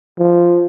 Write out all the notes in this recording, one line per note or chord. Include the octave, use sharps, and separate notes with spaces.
F3